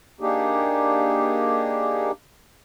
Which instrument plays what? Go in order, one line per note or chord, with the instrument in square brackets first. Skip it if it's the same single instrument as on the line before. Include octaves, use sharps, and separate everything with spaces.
[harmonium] A#3 D4 D#4 G4 G#4